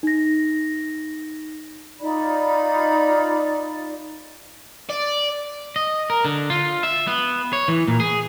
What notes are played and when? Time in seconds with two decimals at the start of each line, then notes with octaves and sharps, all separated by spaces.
0.03 D#4 A#6
2.00 D#4 F4 D5 B5
4.89 D5
5.76 D#5
6.10 A#4
6.25 D3
6.50 F4
6.83 E5
7.07 B3
7.53 C#5
7.68 E3
7.88 A#2
8.00 G#4